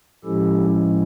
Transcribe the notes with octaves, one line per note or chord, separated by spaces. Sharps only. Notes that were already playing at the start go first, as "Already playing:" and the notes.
A2 F3 G#3 C#4 E4 G4 A4